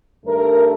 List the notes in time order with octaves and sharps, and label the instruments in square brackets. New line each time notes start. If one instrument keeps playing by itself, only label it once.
[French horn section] G2 D#3 A3 A#4